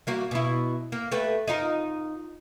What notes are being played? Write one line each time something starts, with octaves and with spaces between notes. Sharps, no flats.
G3 A#3 F#4
B2 E4
A#3
A3 G4 B4
D#4 F4 A#4